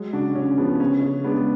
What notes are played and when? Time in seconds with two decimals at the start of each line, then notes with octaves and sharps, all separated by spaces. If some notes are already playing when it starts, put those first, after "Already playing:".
Already playing: F#3 G#3
0.13 C#3 D4 F#4
0.35 C#3 C#4
0.58 F3 B3
0.80 C#3 C#4
1.02 C#3
1.24 G#3 B3 D4